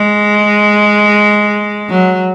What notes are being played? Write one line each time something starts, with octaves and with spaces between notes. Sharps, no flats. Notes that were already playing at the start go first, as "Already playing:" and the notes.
Already playing: G#3
F#3